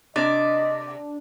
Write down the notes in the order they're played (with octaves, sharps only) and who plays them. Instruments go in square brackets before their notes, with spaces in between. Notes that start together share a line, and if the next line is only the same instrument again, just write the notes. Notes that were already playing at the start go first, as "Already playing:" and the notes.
[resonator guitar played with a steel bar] C3 [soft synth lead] D4 [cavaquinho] D5 [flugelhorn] D#5